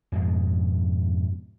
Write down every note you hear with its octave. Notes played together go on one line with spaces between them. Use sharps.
F2 G#2 B2 G#3